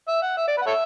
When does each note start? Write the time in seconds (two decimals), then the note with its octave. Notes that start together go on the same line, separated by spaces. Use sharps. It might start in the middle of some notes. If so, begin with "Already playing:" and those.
0.08 E5
0.22 F#5
0.37 E5
0.47 D5
0.57 B4
0.62 F#5
0.67 A4 C#5 E5